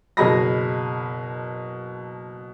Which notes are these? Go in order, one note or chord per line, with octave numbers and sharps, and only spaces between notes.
F#1 B2 G#4 D#5 B5 A#6